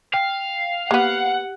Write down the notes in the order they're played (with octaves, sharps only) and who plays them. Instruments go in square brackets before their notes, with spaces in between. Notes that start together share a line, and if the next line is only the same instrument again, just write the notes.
[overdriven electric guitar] F5 [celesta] G5
[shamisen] A#3 B3 [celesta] G4 [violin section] F#5